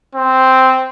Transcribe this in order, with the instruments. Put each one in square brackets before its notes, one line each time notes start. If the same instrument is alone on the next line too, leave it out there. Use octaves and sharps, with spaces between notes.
[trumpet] C4